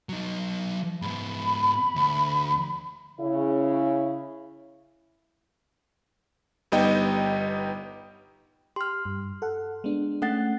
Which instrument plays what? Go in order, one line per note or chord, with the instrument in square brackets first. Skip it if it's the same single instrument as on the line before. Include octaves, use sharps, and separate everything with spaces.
[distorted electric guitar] F#3 D#4
[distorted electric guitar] G#2 B3 [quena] B5
[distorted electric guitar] D2
[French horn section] C#3 E4
[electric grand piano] G1 G3 B3 D#4 D#5 G5
[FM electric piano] G4 [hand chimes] C6 F6
[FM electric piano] G2
A4 F#5
G#3 B3 D4
[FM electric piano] A3 [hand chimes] C#4 F#5 A6